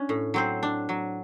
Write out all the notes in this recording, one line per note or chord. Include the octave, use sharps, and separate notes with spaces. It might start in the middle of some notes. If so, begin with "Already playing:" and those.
Already playing: C#4 D4
A2
F#3 C4 C5
D4
F#3